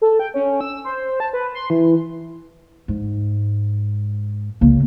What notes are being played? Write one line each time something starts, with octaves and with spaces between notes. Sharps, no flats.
A4
G5
C#4
E6
C5
A5
B4
C6
E3
G#2
C#2 A#3